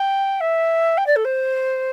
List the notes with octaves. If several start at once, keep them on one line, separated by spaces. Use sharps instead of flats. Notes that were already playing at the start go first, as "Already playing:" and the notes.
Already playing: G5
E5
G5
D5
A4
C5